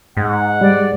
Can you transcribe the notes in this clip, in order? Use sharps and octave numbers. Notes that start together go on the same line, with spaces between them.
G#2 F#5
G3 D5